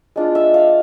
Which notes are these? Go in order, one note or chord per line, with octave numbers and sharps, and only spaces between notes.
G#3 D4 F4
E5
F5